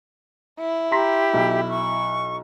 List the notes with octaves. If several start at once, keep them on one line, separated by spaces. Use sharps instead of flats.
E4
G4 A#5 C6 B6
B1
C#6